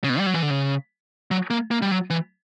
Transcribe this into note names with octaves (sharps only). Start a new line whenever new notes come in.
C#3
B2
G3
F#3
E3
D3
C#3
F#3
A#3
A#3
G3
F#3
E3